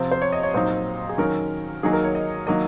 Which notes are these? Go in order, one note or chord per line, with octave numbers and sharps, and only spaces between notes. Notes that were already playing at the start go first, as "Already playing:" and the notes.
Already playing: C3 F3 C4
C5
C#5
D#5
C#5
A#2 F#3 C4 D#4 C5
G#4
D#3 F#3 C#4 A#4
D#3 F#3 A#3 D#4 G#4
A#4
C#5
D#5
D#3 F#3 A#3 D#5